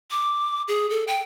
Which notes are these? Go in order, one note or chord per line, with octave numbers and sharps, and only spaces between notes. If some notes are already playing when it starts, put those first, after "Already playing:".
D6
G#4
A4
G5